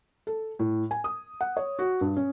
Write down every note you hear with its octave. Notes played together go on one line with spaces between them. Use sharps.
A4
A2
G#5
D#6
F#5
C#5
F#4
G2
C#4